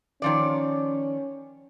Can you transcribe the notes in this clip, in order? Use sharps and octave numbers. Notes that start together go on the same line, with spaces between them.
D#3 F3 C#4 D5